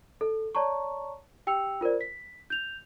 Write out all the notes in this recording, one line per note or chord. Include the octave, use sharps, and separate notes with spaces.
A4
C#5 D5 A5 A#5 C#6
G4 G5 E6 C#7 F7
F4 A#4 C5 D5
B6
G6 F7